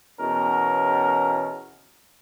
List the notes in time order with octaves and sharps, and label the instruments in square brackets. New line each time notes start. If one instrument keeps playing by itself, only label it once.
[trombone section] E2 B2 C#4 A#4